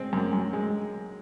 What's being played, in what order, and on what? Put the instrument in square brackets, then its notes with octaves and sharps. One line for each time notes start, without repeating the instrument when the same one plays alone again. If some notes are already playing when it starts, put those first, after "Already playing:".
Already playing: [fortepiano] G#3 C4
F#2
F#2
G#3